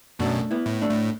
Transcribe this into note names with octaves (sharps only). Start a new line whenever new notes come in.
F#2 B2 A3 D4
B3 E4
A2
A3 D4
A2